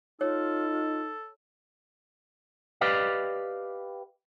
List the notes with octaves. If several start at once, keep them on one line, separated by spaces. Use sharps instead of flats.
D#4 F4 A4 C#5
G4 B4 D5 D#5 F5